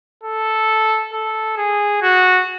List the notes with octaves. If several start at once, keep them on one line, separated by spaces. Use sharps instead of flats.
A4
A4
G#4
F#4